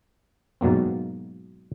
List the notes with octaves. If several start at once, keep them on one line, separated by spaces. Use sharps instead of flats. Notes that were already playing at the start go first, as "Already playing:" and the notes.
G#2 B2 F#3 A#3 C4